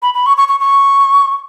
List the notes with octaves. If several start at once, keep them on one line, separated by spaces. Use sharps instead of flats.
B5
B5
C#6
C#6
C#6
C#6